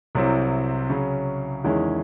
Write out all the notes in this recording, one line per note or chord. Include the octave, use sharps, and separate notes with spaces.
C2 C3 F#3 C4 E4
C#3 F#3 C#4
E2 D#3 G#3 C#4 E4